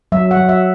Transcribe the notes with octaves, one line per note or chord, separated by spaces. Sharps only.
F#3 E5
F#5
F#3
E5